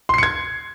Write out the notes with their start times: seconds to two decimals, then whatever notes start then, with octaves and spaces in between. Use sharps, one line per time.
0.09 C6
0.14 C7
0.18 C#7
0.23 G#6